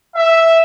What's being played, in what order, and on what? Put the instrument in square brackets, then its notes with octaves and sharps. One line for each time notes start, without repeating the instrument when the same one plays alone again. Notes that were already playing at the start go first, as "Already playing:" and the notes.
[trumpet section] E5